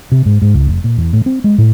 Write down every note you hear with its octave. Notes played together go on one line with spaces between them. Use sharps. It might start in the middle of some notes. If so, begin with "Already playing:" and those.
C3
G#2
G#2
C#2
F1
A#2
E2
A2
C4
G#3
A2